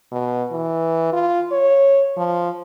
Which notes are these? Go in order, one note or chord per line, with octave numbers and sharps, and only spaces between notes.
B2
E3
F4
C#5
F3